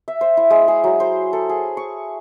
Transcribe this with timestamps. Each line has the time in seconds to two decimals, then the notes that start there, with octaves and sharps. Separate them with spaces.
0.08 E5
0.21 C5
0.37 E4
0.50 G#3
0.68 G#4
0.84 F#3
1.00 C5
1.33 A4
1.49 G#4
1.77 C#6